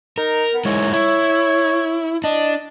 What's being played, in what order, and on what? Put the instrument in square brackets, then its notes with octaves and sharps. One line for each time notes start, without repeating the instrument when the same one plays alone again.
[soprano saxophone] D#4 [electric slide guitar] A#4
[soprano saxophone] B3
[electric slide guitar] G#3 D#4 E4 [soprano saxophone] C#5
[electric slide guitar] E4 [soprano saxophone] C#5
[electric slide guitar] D4 [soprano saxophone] D#5